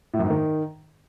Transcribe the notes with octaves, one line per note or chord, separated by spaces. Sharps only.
A2
F#2
G#2
D#3